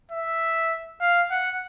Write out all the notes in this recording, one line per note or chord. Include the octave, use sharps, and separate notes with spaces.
E5
F5
F#5